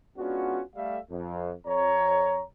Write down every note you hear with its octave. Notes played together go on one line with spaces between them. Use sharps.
G#3 B3 C#4 D4 F4 F#4
G3 A3 E5 F5
F2
F2 C#5 A#5